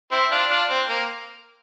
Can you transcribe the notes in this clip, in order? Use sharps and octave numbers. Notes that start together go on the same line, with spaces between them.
C4 E4
D4 F4
D4 F4
C4
A#3